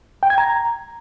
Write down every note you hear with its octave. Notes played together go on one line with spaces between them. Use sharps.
G5
G#6
A#5